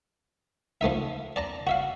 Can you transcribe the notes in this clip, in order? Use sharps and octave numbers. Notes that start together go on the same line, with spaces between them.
F3 A3 D#4 E5
D5 A5 A#5
F#4 E5 F5